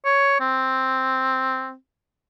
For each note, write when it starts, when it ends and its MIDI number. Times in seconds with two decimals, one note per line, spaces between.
0.05 0.38 73
0.40 1.74 60